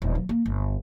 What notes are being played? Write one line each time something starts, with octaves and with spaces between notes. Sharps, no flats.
D#1
F#3
A#3
G1